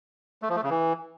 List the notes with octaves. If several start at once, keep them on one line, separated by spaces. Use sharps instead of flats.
A3
F3
A3
C#3
E3